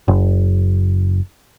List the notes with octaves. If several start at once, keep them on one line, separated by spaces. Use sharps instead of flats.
F#1